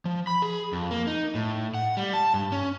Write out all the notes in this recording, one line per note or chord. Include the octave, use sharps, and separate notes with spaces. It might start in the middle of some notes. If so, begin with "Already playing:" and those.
F3
B5
G#4
F2
A#3
D#4
A2
F#5
G3
A5
G2
C#4